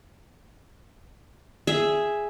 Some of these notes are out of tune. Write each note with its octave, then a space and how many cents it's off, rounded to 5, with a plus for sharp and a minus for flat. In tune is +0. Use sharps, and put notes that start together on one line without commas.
G#4 +0 E5 +0